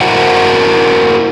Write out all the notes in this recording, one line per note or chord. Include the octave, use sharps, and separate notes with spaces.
E4 F#4 A#4 C5 F#5